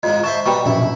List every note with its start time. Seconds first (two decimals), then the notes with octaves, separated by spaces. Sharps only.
0.03 F2 G#2 F3 D#5
0.23 C5 E5 A5 C#6
0.46 B2 G3 G5 A#5 C#6
0.66 A#1 F#2 B2 E4